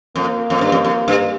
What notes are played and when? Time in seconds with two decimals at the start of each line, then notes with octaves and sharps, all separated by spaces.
0.16 F2 A#3
0.50 F2
0.61 G2
0.72 F2
0.84 F2
1.08 G2